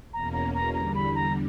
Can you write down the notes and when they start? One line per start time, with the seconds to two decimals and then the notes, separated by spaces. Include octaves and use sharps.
0.13 E2 B2 A#3 C#4 A#5
0.33 A#5
0.54 A#5
0.74 E2 D3 G3 A#5
0.95 B5
1.15 A#5